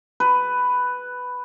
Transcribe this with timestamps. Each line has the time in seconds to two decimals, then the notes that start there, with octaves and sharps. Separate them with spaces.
0.20 B4